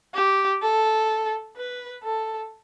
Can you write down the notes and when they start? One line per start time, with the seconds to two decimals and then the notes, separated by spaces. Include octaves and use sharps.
0.14 G4
0.62 A4
1.57 B4
2.04 A4